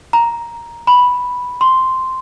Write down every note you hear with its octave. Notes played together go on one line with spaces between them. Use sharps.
A#5
B5
C6